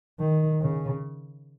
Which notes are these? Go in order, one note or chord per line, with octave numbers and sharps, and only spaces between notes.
D#3
C#3